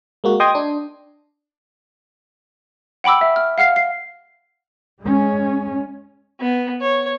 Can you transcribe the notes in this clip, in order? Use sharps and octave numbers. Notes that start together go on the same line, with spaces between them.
G#3 A#3 F#4
D#5 G5 C6 D#6 G#6 A#6
D4
F#5 G5 B5 D6 E6
E5
F6
F5 F#5 F6 C7
C7
G#3 C#4
B3
C#5